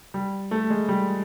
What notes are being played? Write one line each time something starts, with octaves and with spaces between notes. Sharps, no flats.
G3
A3
G#3
G3